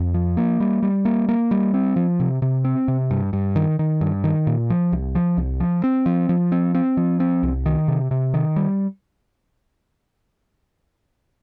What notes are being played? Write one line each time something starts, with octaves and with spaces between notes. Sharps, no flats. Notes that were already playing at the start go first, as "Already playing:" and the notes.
Already playing: F2
F3
A#3
G3
G3
A#3
A#3
G3
C4
F3
C3
C3
C4
C3
G2
G2
D#3
D#3
G2
D#3
A#2
F3
C2
F3
C2
F3
C4
F3
F3
C4
C4
F3
C4
C2
D#3
C3
C3
D#3
G3